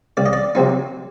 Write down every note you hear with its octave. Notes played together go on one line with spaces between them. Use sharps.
C2 D5
D#5
D5
C3 F#3 C4 D#4